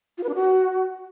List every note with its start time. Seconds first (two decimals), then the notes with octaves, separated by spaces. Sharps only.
0.18 F4
0.23 B4
0.29 D4
0.35 F#4